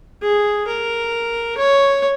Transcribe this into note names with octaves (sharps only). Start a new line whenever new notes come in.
G#4
A#4
C#5